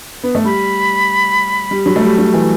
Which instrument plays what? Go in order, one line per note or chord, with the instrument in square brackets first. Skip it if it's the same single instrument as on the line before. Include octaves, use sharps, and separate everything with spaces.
[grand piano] B3
A3
[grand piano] G3 [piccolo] B5
[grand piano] G3
F#3
A3
G3
F#3
E3